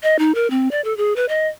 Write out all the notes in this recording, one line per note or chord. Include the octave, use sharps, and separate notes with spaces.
D#5
D#4
A#4
C4
D5
A4
G#4
B4
D#5